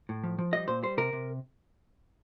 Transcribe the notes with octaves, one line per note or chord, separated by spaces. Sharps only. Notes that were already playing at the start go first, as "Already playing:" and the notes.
A2
F3
F3
G3 D#5
A#2 C5
G3 C5
C3 A#4
C3